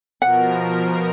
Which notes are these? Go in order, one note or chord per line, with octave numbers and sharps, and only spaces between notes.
B2 F3 A#4 F#5